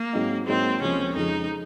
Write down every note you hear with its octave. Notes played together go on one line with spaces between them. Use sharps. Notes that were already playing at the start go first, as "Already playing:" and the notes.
Already playing: A#3
G#2 F#3 C4 D#4
G#2 F#3 A#3 C4 D#4
C#2 C3 F3 A#3 C#4
F2 C#3 F3 G#3 D#4